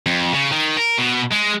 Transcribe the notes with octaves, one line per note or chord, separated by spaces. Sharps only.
F2
C#3
D#3
A#4
B2
G#3